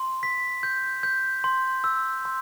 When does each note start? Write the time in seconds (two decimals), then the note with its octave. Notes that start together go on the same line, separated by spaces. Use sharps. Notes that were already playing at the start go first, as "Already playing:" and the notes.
Already playing: C6
0.23 B6
0.63 G6
1.03 G6
1.44 C6
1.84 E6
2.25 C6